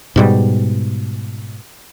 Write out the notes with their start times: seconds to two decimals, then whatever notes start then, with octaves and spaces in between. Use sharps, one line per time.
0.16 G#2 B2 G3